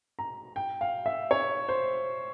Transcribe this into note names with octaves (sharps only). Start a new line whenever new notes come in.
A#5
G5
F5
E5
C#5
C5